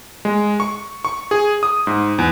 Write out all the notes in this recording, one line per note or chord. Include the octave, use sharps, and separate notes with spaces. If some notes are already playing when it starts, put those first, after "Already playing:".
G#3
C#6
C#6
G#4
D#6
G#2
E2